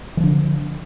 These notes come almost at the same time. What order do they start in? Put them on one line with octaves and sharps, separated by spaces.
E3 F3 D3